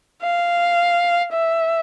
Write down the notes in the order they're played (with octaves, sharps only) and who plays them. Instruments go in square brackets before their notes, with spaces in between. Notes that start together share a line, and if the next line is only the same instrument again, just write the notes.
[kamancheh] F5
E5